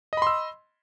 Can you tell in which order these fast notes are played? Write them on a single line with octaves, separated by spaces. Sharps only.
D#5 B5 C6 E6